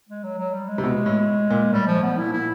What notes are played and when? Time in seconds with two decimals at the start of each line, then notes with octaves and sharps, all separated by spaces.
0.09 G#3
0.24 F#3
0.38 F#3
0.54 G3
0.68 G#3
0.78 C3
0.84 B2
1.06 A2
1.50 A#2
1.73 A2 G3
1.87 F3
1.95 A2
2.03 B3
2.18 A#2 E4
2.33 E4